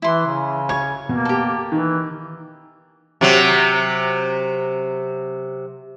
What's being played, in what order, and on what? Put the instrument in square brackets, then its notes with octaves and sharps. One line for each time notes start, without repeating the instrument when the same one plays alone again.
[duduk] E3 [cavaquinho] E4 C6
[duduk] C#3
[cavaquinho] C#5 [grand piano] G#6
[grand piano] B2 [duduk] A#3
[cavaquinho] G4 A4
[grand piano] D#3 [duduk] E3
[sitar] C3 F#3